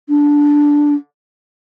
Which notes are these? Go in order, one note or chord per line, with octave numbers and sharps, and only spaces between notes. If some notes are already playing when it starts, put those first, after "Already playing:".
D4